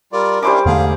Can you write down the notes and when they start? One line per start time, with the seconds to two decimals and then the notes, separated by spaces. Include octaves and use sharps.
0.12 G3 F4 A#4 D5
0.43 G3 C#4 D4 E4 C5 D6
0.66 E2 G#2 D3 A3 G#4 F5